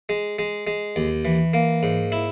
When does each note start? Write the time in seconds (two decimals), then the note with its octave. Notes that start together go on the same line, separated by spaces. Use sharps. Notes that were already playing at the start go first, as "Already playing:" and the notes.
0.09 G#3
0.39 G#3
0.67 G#3
0.96 D#2
1.25 E3
1.54 A#3
1.83 G#2
2.12 E4